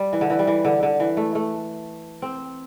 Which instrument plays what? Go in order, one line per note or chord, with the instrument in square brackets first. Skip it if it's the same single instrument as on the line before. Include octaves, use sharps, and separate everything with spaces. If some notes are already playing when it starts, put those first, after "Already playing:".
Already playing: [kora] G3
E3
D3
E3
G3
E3
D3
D3
E3
A3
A3
C4